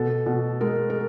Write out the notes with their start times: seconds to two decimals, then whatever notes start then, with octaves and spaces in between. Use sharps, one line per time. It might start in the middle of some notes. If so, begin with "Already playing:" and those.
Already playing: B2 A4
0.26 B2
0.61 G#3 A#4
0.90 A#4